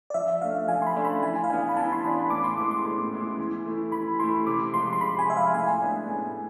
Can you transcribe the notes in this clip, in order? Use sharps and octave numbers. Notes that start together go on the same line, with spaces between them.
D5
F3 E5
A3 D4 F5
F3 G#5
C6
B5
A3 D4
B5
E3 G#5
F5
B3 D4 G#5
B5
E3 A5
C6
B3 D4 B5
A2 D6
C6
G#3 B3 E4 D6
C6
A2
G#3 B3 E4
E3
A3 E4
E3 B5
A3 E4 C6
C3 D6
F3 G#3 C6
C6
C3 B5
G#5
F3 G#3 E5
F5
A2 G#5
G#3 B3 D4
A2